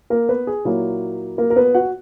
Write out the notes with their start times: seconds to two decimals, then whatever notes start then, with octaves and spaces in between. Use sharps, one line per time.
0.10 A#3 A#4
0.29 B3 B4
0.47 G#4
0.65 A#2 F#3 A#3 E4
1.38 A#3 A#4
1.50 A#4
1.56 B3 B4
1.74 F#4 F#5